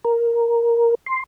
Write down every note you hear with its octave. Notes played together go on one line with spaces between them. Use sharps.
A#4
C6